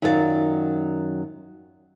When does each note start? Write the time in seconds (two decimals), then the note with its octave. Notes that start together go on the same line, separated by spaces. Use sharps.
0.02 F#2 D#3 F#3 F4 A4 D5